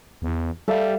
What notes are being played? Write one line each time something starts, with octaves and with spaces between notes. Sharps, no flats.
E2
G3 A4 E5 F5